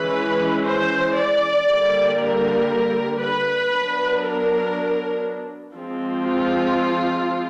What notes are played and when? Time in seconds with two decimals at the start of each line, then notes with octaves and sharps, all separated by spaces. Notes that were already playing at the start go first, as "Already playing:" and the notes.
Already playing: E3 G#3 C#4 B4
0.66 C5
1.16 D5
1.68 D3 G3 A#3
2.19 A#4
3.20 B4
3.71 F#3 B3 D4
4.22 A#4
5.76 F3 G#3 C4
6.26 F4